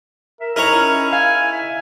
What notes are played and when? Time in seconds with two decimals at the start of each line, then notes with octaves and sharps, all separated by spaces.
0.41 A#4 E5
0.56 D#4 E4 G#4 A#4 C#5 F6
0.74 C#4 E4
1.13 F5 G#5
1.52 E5